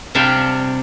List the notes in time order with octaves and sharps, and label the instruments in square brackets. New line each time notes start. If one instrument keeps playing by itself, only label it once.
[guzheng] C3 G3 D4 E5 F5 G5